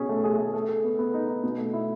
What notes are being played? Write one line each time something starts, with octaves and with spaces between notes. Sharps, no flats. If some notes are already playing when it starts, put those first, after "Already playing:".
Already playing: B2 C#4 G#4
A3
G#4
A3
A4
A4
B3
B3
D#4
D#4
B2
A3
E4